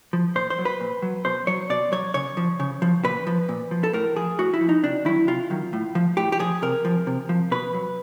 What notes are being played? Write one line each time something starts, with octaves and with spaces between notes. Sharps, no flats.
F3
A#2 C5
C5
F#3
B4
A#2
F#3
B2 C5
F#3 C#5
B2 D5
F#3 C#5
C#3 C#5
F3
C#3
F3
A#2 B4
F3
A#2
F3
A4
A2 A#4
F3 G#4
A2 F#4
E4
F3
D#4
C3 D4
D#3 F#3 E4
C3 F4
D#3 F#3
A2
F3
A2 G4
G4
F3 G#4
C3 A#4
F3
C3
F3
B2 B4
F#3